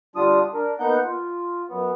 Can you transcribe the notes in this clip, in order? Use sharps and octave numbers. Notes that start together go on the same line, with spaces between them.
D3 G3 D4 F4 D#6
D4 A#4
A#3 B3 D#4 F#5 G6
F4
F#2 B3